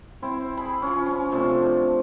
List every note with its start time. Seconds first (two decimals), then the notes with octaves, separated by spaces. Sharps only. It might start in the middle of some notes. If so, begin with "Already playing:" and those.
0.22 C4 E4
0.57 G#4 B5
0.82 F3 C#4
1.06 C#4
1.32 C3 F3 A3 D4